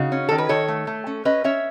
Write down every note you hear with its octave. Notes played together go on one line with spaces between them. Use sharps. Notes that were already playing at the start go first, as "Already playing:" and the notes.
Already playing: C#3 D#4 F#4
C#4
D#3 A4
B4
D#3 A4 C#5
A3
A3
C#4
C#4 B4 D#5
C#4 C#5 E5